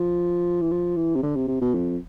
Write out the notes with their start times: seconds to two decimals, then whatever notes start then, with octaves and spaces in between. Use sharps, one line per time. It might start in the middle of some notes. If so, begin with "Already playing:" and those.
Already playing: F3
0.62 E3
0.71 F3
0.96 E3
1.16 C3
1.23 D3
1.36 C3
1.48 C3
1.61 B2
1.74 F2